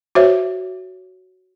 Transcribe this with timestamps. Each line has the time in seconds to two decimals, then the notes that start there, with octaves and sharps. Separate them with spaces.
0.15 F#4 C5 C#5 E5